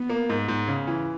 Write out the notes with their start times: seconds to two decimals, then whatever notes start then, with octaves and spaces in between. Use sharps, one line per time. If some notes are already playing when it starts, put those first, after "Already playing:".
Already playing: B3
0.10 A#3
0.29 G#2
0.48 G#2
0.68 C#3
0.87 E3